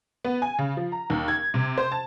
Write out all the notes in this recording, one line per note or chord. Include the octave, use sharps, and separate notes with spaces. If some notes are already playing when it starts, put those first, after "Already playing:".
B3
G#5
C#3
F3
A#5
D#2
G#6
C3
C5
A5